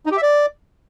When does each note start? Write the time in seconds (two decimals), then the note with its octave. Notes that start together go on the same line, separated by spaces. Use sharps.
0.06 D#4
0.11 G4
0.17 E5
0.22 D5